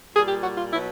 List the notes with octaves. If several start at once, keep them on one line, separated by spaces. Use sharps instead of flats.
A#2 G3 G#4
G4
F#4
F4
B2 F#3 E4